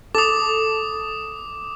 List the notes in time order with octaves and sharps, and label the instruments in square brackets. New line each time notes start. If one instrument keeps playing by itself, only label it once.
[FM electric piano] A4 [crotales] D6 D#6